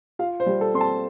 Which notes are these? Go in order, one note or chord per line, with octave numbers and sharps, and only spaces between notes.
F4 F5
C5
G3
A4
C4 C6
A5